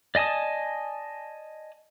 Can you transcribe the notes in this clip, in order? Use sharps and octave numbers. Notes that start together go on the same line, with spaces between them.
D5 D#5 G#5 A5 D#6